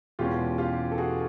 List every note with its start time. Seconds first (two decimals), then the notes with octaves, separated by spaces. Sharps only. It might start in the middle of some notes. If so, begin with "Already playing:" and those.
0.19 E2 B2 G#3 C#4 F4 G4
0.58 F4 G4
0.92 A4
0.98 F#4 G#4